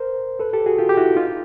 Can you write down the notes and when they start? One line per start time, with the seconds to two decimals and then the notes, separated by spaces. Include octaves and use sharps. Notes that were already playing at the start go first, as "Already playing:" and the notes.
Already playing: A#4 C5
0.39 A4 B4
0.53 G4 A4
0.66 F#4 G#4
0.78 F4 G4
0.89 G4
0.97 E4 F#4
1.16 D#4 F4